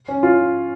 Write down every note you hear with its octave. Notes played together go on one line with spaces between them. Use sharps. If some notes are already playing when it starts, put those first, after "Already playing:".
C#4
F4